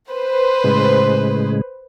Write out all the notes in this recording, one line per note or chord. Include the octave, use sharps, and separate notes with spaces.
B4 C5
A2 C#3 G#3